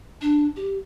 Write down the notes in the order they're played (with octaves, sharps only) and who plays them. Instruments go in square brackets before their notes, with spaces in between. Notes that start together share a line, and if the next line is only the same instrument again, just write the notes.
[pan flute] D4
G4